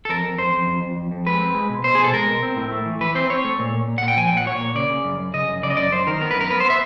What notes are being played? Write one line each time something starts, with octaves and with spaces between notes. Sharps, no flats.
A4
F2 A#4
F2
F2 C5
F2
F2
F2
F2
F2
G#3 B4
C4
G#3
B2
B2 C5
B2 G#4
A4
G#3 A#4
B2
C4
A2
A3
E3
E3 B4
C4 C5
C4 C#5
A3
A#2
A#2
A#2
F#5
A#2
G5
F3 G#5
G5
A#2 F#5
A#2 C#5
A#3
C#3 D5
C#3
F#2
F#2
C#3 D#5
F#2
C#3 D5
D#5
F#2 D5
F#2 C5
D#3 A#4
B3 A#4
B4
F#2 A#4
B3 B4
C5
B3
E5